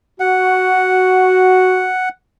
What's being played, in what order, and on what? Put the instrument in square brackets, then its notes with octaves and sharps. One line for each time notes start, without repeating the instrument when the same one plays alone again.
[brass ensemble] F#4 [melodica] F#5